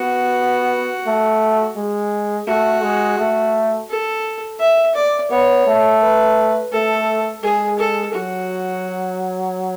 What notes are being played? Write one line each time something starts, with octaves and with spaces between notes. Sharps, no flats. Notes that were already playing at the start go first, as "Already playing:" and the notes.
Already playing: B3 F#4
A3
G#3
A3 F#4
G#3
A3
A4
E5
D5
B3 C#5
A3
B4
A3 A4
G#3 G#4
A4
F#3 F#4